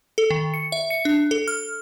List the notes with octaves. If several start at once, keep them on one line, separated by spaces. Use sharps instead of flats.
A4
D#3
C#7
E5
C#7
D4
A4
F6